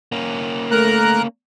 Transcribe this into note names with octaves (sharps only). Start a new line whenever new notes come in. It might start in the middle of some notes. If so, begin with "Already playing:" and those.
A#3 C#4
A3 A#4 A#5 F#6